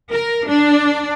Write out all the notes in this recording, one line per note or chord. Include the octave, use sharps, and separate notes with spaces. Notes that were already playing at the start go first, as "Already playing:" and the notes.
A#4
D4